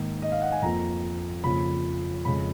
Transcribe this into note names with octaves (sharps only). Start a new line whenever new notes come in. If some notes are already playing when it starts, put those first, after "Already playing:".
Already playing: G#2 D#3 A#3
D#5
F5
F#5
G#5
F2 F3 A#3 A#5
F2 C#3 F3 A#3 B5
F2 C#3 G#3 B5